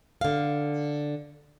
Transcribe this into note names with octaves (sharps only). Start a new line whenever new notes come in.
D3 F5